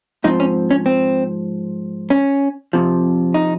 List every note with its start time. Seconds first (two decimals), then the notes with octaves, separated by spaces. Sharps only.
0.24 G#2 F3 C4 D#4
0.40 C#4
0.71 C#4
0.86 C4
2.10 C#4
2.73 F2 C3 F3
3.34 D#4